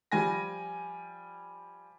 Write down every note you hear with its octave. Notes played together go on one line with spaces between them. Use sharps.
F3 G3 G#5 A#6